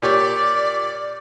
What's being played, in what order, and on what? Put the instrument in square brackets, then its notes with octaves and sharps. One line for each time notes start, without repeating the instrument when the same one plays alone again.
[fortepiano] A#2 G4 C#5 [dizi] D5